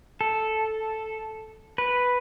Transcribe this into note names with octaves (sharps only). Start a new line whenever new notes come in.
A4
B4